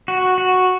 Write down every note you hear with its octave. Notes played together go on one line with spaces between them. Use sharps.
F#4
F#4